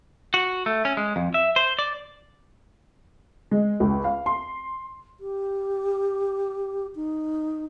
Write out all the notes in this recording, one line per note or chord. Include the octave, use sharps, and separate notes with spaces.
F#4
A3
C#4
G#3
F2
E5
C5
D5
G#3
C#2
F5
C6
G4
D#4